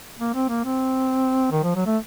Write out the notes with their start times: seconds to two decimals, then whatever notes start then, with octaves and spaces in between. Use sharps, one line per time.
0.19 A#3
0.34 C4
0.49 A#3
0.64 C4
1.52 D#3
1.64 F3
1.76 F#3
1.86 A3